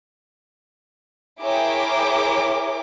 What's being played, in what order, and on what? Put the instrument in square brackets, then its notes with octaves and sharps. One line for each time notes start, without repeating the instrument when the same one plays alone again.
[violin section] E4 G#4 A#4 C#5 G5 D6